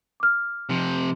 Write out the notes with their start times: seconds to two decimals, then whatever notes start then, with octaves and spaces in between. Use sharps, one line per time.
0.20 D6 F6
0.69 C3 F3